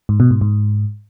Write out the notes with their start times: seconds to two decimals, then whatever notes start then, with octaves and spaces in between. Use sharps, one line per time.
0.09 G#2
0.20 B2
0.31 G#2
0.41 G#2